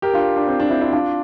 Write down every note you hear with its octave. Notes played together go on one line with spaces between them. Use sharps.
G4 A#4
D4 F4
D4
C4
D4
C4 E4
C4 E4
D4 F4